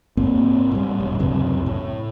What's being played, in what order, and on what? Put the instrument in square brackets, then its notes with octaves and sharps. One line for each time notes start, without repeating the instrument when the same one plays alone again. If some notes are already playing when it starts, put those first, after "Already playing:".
[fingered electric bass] G#2 A#3 C4
A2 G3
E1
C#2 F#2 C3
A2